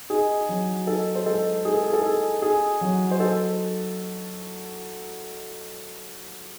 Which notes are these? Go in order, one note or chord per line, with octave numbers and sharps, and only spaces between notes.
D#4 G#4
F#3
D#4 A4
C5
G#3 A4
D#4 G#4
A4
G#4
A4
D#4 G#4
D#4 G#4
F#3
C5
D#4 A4